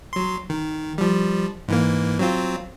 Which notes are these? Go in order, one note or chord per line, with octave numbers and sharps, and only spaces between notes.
F#3 C6
D#3
F3 G3
G#2 E3 A#3
F#3 C4 F4